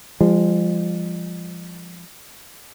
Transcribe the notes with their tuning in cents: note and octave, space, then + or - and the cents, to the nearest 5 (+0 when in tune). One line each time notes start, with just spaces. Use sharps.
F3 -10 G#3 -45